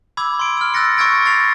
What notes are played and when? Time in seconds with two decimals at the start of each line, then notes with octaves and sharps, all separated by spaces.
0.17 B5 D6 E6 G#6
0.39 C6 D7
0.57 E6 F6
0.74 E6 F#6 A6 A#6 C#7
0.97 C#6 E6 F6 G#6 A#6 D7
1.25 A6 C7 F7